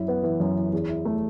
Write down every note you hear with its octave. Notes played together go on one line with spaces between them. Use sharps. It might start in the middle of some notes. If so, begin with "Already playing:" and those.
Already playing: F#2 E4
B3
E3
F#2
E4
E2
E4
A3